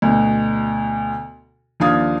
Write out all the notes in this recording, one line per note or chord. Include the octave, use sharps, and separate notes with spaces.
D2 B2
D#2 F3 D4 F5 D#6 G#6